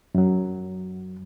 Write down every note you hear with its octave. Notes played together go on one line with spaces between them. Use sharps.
F#2 F#3